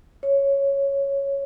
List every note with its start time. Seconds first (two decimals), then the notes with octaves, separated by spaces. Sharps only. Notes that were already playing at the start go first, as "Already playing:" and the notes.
0.23 C#5